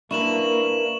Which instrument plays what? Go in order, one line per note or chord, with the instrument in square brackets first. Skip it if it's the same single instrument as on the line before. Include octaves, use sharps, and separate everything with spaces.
[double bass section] A#3 [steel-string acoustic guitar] D4 A#4 B4 [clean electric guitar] E4 [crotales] C#6 E7 F#7